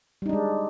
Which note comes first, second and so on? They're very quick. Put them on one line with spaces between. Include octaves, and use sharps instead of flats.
G3 D#4 D4 G#3